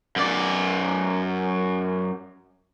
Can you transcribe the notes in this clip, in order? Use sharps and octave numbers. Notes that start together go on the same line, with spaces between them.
F#2 D5